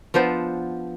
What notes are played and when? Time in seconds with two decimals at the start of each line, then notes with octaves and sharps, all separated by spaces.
0.14 F3 B3 D4 C5